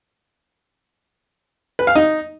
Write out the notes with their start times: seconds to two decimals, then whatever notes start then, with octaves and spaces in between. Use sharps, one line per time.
1.79 B4
1.87 F5
1.95 D#4